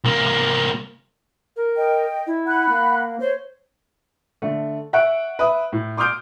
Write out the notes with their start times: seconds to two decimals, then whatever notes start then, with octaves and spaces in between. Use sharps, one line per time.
0.04 C2 A#3
1.57 A#4
1.76 D#5 G5
2.27 E4
2.46 F#5 B5 F#6
2.69 A#3
3.20 C5 C#5
4.42 D3 A3
4.93 E5 F#5 C#6 F#6 D7
5.39 B4 E5 D#6
5.72 A2
5.97 C6 D6 D#6 F6 G6 D7